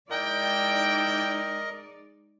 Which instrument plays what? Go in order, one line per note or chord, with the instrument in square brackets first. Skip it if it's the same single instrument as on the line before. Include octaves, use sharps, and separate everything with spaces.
[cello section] G#3 D#4 D5 [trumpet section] E4 G5 [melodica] A#4 D#5